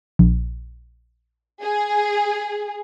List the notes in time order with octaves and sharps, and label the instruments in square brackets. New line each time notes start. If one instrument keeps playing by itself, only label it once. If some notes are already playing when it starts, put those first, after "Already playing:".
[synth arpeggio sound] A#1
[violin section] G#4